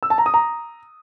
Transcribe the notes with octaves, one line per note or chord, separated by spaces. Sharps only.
E6
A5
A#5
D#6
A#5